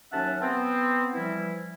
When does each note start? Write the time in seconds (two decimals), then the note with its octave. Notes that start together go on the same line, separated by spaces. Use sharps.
0.13 D#2 F#3 C#4 E5 F#5 A5
0.41 B3 C4
1.14 E3 F3 G3 E4